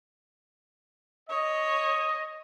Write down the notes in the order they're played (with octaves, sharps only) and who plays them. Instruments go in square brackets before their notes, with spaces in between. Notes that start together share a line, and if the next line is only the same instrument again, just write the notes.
[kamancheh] C#5 [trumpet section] D#5